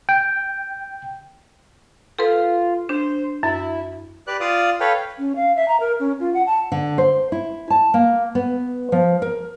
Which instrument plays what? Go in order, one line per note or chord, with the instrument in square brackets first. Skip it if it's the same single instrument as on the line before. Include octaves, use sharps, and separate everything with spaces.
[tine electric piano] G5
[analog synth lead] F4 [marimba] A4 B4
[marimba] D4 [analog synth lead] C5
[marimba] F#2 [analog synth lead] E4
[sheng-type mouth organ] G4 B4 D5 F#6
F4 D5 F5 D#6
A4 B4 C#5 F5 G5
[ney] C#4
F5
E5
A#5
A#4
C#4
F4
F#5
A5
[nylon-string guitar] D3
C5
E4
A5
A#3
B3
F3
A#4